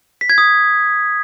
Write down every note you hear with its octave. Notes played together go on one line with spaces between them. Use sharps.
B6
G#6
D#6